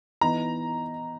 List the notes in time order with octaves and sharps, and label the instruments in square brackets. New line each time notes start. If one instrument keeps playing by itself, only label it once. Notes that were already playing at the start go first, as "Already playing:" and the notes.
[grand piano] E3 B3 D#4 A#5